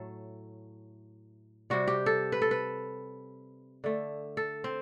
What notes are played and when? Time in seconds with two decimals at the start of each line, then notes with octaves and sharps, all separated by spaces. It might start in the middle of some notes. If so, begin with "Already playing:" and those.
Already playing: A2 F#3 A3 A4
1.70 C3 G3 F#4
1.87 G4
2.06 A4
2.32 B4
2.42 A4
2.51 B4
3.84 D3 A3
4.37 A4
4.64 C4